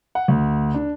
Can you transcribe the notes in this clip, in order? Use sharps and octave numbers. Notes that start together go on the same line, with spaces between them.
F#5
D2
D4